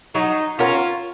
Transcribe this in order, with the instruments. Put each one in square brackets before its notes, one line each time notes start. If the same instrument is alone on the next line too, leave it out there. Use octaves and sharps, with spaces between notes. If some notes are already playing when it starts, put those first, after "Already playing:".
[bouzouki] F#3 [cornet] D#4
[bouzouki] C#4 F#4 A#4 [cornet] F4